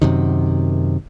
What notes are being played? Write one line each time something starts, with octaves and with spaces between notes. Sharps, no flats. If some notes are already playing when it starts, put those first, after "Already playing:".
F#2 C3 D#3